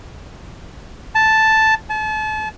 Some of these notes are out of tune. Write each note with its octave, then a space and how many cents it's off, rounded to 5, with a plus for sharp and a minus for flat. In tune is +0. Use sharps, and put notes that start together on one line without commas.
A5 +0
A5 -35